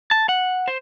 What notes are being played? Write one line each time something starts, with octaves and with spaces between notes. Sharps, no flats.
A5
F#5
C5